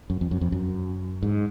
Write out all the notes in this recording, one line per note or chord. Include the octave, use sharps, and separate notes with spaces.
F#2
F2
F#2
F2
F#2
G#2